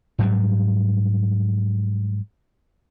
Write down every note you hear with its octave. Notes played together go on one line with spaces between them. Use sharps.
G#2 F#3 G3